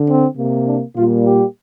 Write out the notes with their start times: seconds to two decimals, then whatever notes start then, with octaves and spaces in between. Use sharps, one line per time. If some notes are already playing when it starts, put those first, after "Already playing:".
Already playing: D3
0.08 C4
0.37 C3 A#3
0.66 D4
0.96 A#2 G3 A#3 F4
1.25 G4